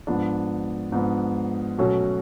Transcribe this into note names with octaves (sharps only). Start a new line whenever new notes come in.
G#2 F3 B3 D4
G#2 F3 B3 D4
B2 F#3 A3 C#4 F#4